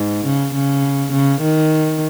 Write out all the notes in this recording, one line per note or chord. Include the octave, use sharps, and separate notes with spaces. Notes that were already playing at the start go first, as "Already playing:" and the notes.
Already playing: G#2
C#3
C#3
C#3
D#3